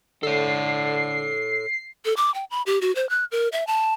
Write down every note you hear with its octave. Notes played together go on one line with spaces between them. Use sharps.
D3 A4 C#5 C7
A4
D6
G5
B5
G4
F#4
C5
F#6
A#4
E5
A5